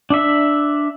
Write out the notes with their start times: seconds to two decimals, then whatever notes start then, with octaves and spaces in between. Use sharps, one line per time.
0.10 D4 E5